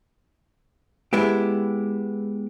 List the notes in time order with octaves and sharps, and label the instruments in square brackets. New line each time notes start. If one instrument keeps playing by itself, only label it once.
[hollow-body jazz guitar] G#3 B3 E4 G4